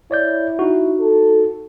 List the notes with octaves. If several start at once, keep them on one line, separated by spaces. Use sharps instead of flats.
E4 C#5 D5 G6
D#4 F#4
A4